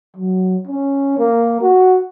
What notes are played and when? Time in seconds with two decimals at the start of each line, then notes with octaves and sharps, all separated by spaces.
0.16 F#3
0.67 C#4
1.18 A#3
1.61 F#4